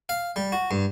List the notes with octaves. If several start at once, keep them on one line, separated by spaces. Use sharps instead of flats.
F5
G3
F#4
G2